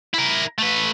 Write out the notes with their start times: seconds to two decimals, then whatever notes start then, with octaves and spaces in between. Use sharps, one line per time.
0.14 E4 A#4
0.59 A3 B4